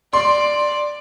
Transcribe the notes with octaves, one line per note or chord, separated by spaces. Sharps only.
D5 C6